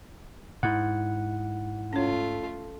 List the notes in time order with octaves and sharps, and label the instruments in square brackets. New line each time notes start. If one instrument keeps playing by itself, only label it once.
[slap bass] G#2 [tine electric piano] E4 F#5
[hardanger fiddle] A3 F4 [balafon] C#4 C#5